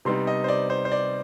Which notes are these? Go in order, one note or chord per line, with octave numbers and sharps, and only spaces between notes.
C3 G3 B3 D#4 C6
D#5
C5
D5
C5
C5
D5